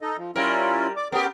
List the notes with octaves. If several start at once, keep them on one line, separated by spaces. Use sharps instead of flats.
D#4 A4 D#5
F3
G3 C#4 E4 F4 A#4
D5 D6
B3 C#4 G4 G#4 A#4